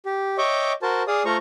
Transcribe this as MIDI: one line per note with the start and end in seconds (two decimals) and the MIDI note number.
0.06 0.37 67
0.38 0.73 73
0.38 0.73 75
0.38 0.73 76
0.38 0.73 79
0.38 0.73 85
0.38 0.73 86
0.82 1.03 66
0.82 1.03 70
0.82 1.03 72
0.82 1.03 81
1.08 1.23 68
1.08 1.23 74
1.08 1.23 77
1.08 1.23 87
1.25 1.37 57
1.25 1.37 65
1.25 1.37 72
1.25 1.37 82
1.25 1.37 85